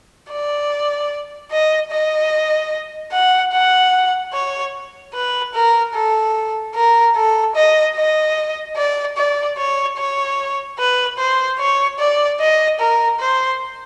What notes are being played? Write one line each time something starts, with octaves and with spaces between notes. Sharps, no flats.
D5
D#5
D#5
F#5
F#5
C#5
B4
A#4
A4
A#4
A4
D#5
D#5
D5
D5
C#5
C#5
B4
C5
C#5
D5
D#5
A#4
C5